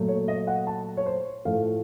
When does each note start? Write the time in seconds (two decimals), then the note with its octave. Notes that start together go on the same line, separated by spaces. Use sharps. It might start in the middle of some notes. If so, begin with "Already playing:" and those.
Already playing: A#2 F#3 A3
0.08 C#5
0.28 D#5
0.47 F#5
0.67 A5
0.97 C#5
1.06 C5
1.45 A2 F3 A3 F5